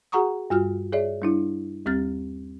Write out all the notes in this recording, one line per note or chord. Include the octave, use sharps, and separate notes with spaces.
F#4 G#4 F#5 A#5 C#6 D#6
G2 G3 F4 F#4 F6
G#4 C#5 D5 E5
G3 D4 E4
D#2 G3 C4 G4 F6 A6